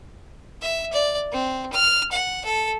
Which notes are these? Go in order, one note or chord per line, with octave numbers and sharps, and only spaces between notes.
E5
D5
C4
F6
F#5
A4